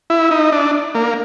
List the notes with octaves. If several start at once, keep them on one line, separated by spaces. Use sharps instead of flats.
E4
D#4
D4
A#3